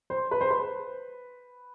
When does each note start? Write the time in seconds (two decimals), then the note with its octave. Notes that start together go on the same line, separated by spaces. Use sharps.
0.10 C5
0.31 B4
0.41 C5
0.50 B4